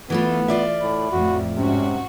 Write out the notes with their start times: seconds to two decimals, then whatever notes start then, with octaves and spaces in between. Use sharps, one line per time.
0.10 E3 A3 B3 F4
0.48 F4 D5 E5
0.81 A2 B5
1.12 F2 A2 F#4
1.56 G#2 C3 C#4 F#4